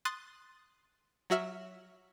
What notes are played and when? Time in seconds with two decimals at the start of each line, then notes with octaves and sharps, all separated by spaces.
0.05 C6 D#6 F#6 A6
1.30 F#3 F#4 E5 F6